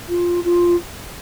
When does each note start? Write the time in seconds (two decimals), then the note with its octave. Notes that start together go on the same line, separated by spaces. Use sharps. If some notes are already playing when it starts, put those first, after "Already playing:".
0.08 F4
0.44 F4